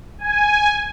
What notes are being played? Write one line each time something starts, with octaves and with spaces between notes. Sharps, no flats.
G#5